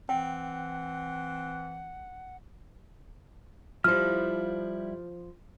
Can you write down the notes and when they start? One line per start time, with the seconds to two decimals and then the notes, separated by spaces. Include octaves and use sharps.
0.09 E3 C4 F#5 G5
3.84 F3 G3 E4 C5 F6